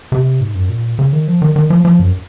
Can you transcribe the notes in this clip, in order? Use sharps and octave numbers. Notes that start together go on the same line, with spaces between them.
C3
G#2
F#2
A#2
C#3
D#3
F3
D#3
D#3
F3
F3
F#2